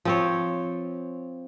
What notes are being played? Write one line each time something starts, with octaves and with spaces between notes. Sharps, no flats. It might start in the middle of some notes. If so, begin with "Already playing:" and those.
F3 C4 C#5